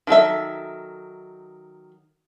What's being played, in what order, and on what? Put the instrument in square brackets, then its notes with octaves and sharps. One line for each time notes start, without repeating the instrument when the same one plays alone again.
[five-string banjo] D#3 F#3 A4 E5